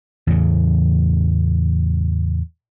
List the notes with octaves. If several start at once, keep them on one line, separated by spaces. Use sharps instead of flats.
E2 A2 C#3